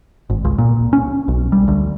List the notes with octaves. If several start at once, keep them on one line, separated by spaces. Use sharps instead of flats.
G#1
C#2
A#2
C#4
B1
G3
D2